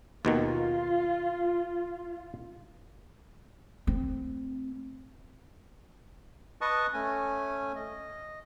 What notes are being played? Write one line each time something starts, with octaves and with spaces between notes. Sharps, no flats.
D#2 B2 D#3 F4
A3 C4
B4 D#5 A5 C#6 D#6
A3 C#4 G#5
D#5